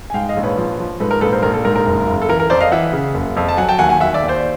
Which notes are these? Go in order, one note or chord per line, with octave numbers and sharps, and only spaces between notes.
G#5
G#2 F5 G5
D#5 F5
A#1
B4 C#5
F3
F3
G#2 A4 B4
A#4
A#1 A4 B4
A#4 C5
A#1 A#4
A4
G#2 A#4
A#4
F#1
F#1
A4
E3 A#4
A#4
F2 C5 D5
D#5 F5
E3 E5 F#5
C#3
F#1
F2
A5
F#3 F#5 G#5
G5 A5
D#2 F#5 G#5
F#5 G#5
D#2 E5 F#5
D5 E5
D#2
C5 D5